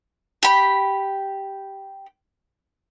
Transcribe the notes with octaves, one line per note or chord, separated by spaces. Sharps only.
G4 B5